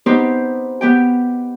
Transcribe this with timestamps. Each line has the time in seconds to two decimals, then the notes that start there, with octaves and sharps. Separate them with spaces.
0.06 B3 C4 D#4 G4 C5
0.81 B3 G4 G5